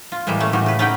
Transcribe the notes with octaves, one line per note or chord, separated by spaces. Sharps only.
F4
A2 E3 G3 G#3 A#3
A3 C#4
A2 E3 G3 F#4
C#3 B4
C#4 D#4 B4 C#5 F#5 G5